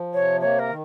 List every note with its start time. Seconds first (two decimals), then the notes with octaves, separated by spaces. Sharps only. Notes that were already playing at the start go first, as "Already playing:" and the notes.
Already playing: F3
0.14 C3 C#5
0.41 A#3 C#5
0.59 A#4
0.68 D#3